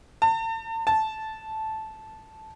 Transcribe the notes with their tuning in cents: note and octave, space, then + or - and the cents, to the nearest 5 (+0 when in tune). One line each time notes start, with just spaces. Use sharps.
A5 +40
A5 -10